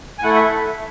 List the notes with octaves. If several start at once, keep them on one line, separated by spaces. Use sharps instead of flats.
G#5
A3 E4 A4 F#5
E5